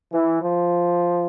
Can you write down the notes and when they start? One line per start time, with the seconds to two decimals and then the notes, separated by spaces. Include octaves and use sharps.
0.12 E3
0.40 F3